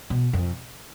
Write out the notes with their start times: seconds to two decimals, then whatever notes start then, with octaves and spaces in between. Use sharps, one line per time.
0.10 B2
0.33 F2